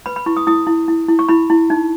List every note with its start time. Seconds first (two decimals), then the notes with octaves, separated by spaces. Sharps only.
0.06 B4 B5
0.16 B5
0.26 E4 C#6
0.37 D#6
0.47 E4 D#6
0.67 E4
0.88 E4
1.08 E4
1.19 C#6
1.29 E4 B5
1.50 E4
1.70 D#4